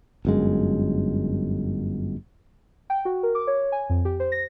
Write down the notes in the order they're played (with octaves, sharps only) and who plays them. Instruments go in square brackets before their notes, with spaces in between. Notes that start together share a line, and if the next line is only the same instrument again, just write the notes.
[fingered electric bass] G1 F#2 G#3
[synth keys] G5
F#4
A#4
D6
C#5
G#5
F2
G4
C5
A#6